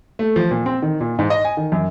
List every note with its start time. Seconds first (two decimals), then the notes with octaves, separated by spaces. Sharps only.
0.19 A3
0.36 F3
0.51 A#2
0.66 C4
0.82 D#3
1.01 A#2
1.19 G#2
1.30 D#5
1.45 G#5
1.57 D#3
1.72 F#2